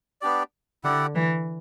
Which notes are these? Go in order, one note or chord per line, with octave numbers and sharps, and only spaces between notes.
B3 D4 G4 D5
D3 E4 G4 D5 F#5
E3